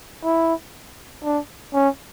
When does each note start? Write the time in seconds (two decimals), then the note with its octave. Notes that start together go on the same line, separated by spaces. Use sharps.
0.24 E4
1.24 D4
1.73 C#4